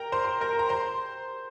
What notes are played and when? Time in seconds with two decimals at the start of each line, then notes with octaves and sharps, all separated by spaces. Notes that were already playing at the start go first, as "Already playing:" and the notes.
Already playing: A#4 G5 A#5
0.12 C5 C6
0.41 A#4 A#5
0.59 A#5
0.69 C5 C6